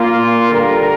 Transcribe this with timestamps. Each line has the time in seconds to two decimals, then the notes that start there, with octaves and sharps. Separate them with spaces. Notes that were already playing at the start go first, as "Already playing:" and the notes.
Already playing: A#2 A#3 F4
0.51 D3 G3 D4 A#4